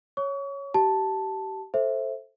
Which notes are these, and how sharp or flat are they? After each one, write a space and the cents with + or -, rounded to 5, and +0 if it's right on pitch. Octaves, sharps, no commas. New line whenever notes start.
C#5 +0 C#6 +35
G4 -30 A5 +0
A4 +0 C5 +15 E5 +0